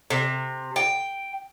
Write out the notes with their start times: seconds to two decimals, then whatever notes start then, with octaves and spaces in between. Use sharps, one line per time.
0.10 C3
0.76 G5